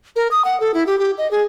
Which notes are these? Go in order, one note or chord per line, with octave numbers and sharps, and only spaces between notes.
A#4
D#6
F#5
A4
E4
G4
G4
D#5
G#4